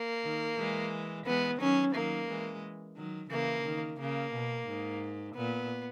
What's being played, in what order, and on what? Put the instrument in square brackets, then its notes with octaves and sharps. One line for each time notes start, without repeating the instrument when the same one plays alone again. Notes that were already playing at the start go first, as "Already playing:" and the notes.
Already playing: [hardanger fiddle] A#3
[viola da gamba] D#3
E3 G#3
[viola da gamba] E3 G#3 [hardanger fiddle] B3
[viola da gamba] D#3 F#3 [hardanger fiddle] C#4
[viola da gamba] D#3 F#3 [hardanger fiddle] A#3
[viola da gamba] E3 G#3
D#3 F#3
[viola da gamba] C#3 E3 [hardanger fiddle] A#3
[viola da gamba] D#3
[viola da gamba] C#3 [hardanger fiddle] A#3
[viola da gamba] B2
G#2
[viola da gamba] A#2 [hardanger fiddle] B3